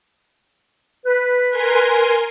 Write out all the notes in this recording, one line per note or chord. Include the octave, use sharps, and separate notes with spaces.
B4
A#4 G#5 C6